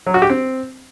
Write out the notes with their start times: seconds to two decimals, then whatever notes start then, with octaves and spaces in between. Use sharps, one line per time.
0.06 F#3
0.14 F#4
0.22 G4
0.30 C4